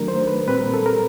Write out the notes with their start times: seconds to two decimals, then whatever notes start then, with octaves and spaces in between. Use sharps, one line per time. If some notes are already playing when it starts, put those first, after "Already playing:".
Already playing: D#3 F#3 A3 D4 A#4
0.08 C5
0.27 B4
0.47 A#2 G3 C4 B4
0.60 A#4
0.74 A4
0.86 A#4